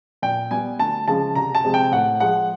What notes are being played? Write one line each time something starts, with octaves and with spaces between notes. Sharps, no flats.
A#2 G5
G3 B3 G#5
D2 A5
C#3 F3 G#3 A5
C2 A#5
A5
C3 F3 G#3 C4
G5
A2 F#5
F3 G#3 F#5